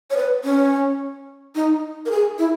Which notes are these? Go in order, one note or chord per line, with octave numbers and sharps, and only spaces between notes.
C#5
B4
C#4
D#4
A#4
G#4
E4